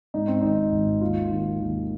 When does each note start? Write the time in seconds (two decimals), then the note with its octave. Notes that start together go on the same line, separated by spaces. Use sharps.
0.14 G#2 D#4
0.28 C4
0.42 G#1 D#4
0.72 G#1
1.01 D#2 F4
1.31 D#3
1.60 D#2